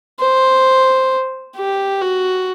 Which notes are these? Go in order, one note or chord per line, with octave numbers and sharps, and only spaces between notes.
C5
G4
F#4